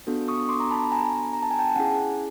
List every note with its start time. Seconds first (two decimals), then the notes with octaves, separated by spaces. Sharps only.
0.07 B3 D4 F#4 A4
0.28 C#6 D#6
0.49 C6 D6
0.60 A#5
0.71 A5 B5
0.92 G#5 A#5
1.33 A#5
1.43 A5
1.51 G#5
1.59 G5 A5
1.76 C#4 E4 G#4 F#5 G#5